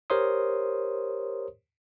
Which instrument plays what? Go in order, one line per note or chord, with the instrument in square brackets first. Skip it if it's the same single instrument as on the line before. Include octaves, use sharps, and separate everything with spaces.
[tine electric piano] G4 A#4 C5 C#5 C6 D#6